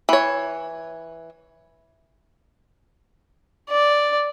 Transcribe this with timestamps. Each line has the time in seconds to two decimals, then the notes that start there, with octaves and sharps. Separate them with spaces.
0.09 E3 C#5
3.70 D5